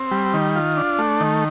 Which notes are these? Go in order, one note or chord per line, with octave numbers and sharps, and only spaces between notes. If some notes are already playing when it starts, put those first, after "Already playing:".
Already playing: C4
G3
D#3
F4
D4
A3
D#3